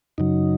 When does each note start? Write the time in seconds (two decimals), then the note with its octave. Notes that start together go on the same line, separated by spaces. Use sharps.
0.18 F#2 C#3 F#3 D#4